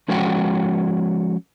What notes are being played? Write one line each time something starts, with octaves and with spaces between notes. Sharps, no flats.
F3 G#3 C#4 F#4 F#5 G5